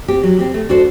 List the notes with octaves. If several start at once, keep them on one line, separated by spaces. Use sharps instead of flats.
C4 G4
F#3
C4 G4
A3
D4 F#4 A4 C5